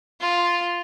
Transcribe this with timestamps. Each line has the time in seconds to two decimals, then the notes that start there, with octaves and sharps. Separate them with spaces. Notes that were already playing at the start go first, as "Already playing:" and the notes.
0.20 F4